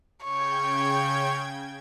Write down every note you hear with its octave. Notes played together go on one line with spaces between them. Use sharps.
C#3 C#5 G5 G#6